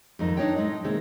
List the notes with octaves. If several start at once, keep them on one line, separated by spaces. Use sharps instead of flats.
F2 G#2 D#3 A3 D#4
D4 D#4 G4 B4 C#5 G5
A2 G#3 D#4
C3 D#3 G#3 A#3 C4